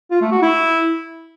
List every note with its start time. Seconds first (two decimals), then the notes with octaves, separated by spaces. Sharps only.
0.11 F4
0.21 A3
0.31 F#4
0.42 E4